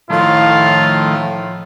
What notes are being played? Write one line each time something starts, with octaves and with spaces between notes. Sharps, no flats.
A2 D#3 F3 A3 F4